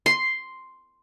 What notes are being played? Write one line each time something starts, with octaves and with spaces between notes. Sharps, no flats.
C6